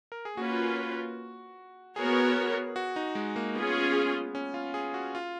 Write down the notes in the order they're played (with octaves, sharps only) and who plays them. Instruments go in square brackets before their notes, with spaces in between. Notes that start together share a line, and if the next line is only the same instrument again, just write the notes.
[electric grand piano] A#4
G#4
[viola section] A#3 C#4 F4 B4 [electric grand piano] F#4
[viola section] B3 F#4 A#4 C#5 [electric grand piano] G#4
[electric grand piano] F#4
D#4
G#3
A#3
[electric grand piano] B3 [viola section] C#4 F4 G#4
[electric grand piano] C#4
F4
G#4
F#4
F4